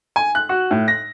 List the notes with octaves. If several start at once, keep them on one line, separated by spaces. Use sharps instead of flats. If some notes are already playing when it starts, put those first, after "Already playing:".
G#5
F#6
F#4
A2
A#6